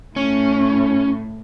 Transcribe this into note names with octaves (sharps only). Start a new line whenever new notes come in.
A2 C#4